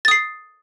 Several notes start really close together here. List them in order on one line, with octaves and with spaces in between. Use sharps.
A6 D#6 C7